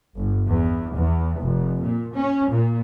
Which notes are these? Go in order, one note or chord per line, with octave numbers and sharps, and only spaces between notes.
G1
E2
E2
F1
A#2
C#4
A#2